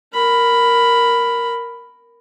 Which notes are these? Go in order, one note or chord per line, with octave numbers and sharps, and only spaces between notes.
A#4 B5